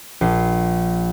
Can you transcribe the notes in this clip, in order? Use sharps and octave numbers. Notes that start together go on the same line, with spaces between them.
A#1 C7